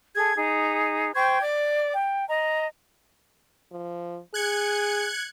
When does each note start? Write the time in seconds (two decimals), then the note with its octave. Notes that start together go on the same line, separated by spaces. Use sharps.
0.15 G#4 A4 G#6
0.36 D#4 G#4
1.15 C5 G5 C#6 G#6
1.41 D5 D6
1.95 G5
2.29 D#5 A#5
3.72 F3
4.34 G#4 F#6 G#6 C#7